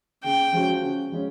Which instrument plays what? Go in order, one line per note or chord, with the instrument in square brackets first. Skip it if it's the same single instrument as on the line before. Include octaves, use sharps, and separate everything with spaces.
[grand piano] C#3 [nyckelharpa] G5
[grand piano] F3 G#3 C#4 F#4
C#3
F3 G#3 C#4